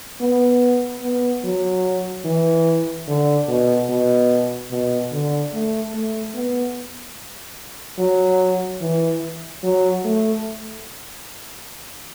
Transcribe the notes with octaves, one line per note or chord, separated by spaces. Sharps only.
B3
B3
F#3
E3
D3
B2
B2
B2
D3
A3
A3
B3
F#3
E3
F#3
A3